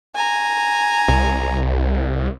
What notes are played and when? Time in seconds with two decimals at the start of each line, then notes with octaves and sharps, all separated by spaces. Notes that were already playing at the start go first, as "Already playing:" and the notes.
0.15 G#5 A#5
1.08 C2